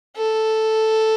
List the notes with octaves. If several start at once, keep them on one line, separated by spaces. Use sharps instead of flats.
A4